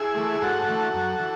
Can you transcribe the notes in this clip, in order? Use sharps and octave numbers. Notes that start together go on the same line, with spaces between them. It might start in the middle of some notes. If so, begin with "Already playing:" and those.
Already playing: E4 G#4
E3 A3
G#2 F#4 A4
E3 A3
F#2
E3